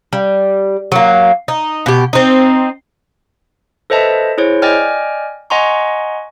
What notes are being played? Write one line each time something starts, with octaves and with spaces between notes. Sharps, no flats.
G3
F#3 A#3
D#4
B2 G4
C4 D#4
A4 B4 C5 D#5 E5 A5
E4 G#4 C5 C#5
D5 D#5 G5 G#5 F6
D#5 F#5 G#5 A#5 C6 C#6